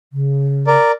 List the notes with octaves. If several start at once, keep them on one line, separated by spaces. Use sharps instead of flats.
C#3
A#4 D5